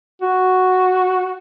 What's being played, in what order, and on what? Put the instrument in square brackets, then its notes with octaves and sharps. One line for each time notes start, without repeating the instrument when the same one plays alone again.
[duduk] F#4